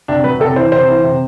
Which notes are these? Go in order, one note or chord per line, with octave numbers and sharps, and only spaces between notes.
C3 D4
F#3 B4
C3 A4
E3 C5
C3 C5
E3
C3